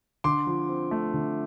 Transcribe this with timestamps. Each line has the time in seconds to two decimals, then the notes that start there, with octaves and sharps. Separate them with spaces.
0.24 D3 C6 D6
0.47 F3
0.69 C4
0.91 A3
1.14 D3